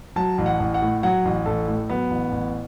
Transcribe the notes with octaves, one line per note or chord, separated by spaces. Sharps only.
F#3 A5
A1
F#5
A1
F#5
A2
F#3 F#5
A1
A1 A4
A2
F#3 B3
A1
A1